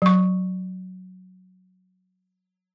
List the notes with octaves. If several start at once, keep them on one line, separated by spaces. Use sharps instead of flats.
F#3 C#6